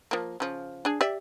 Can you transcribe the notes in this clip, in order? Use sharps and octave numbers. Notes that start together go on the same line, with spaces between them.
F3 A#3
C#3 F3
D4 G#4
G4 D5 E5